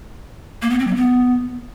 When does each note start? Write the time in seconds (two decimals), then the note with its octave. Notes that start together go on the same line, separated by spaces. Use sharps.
0.62 A#3
0.71 B3
0.79 C4
0.87 F#3
0.96 B3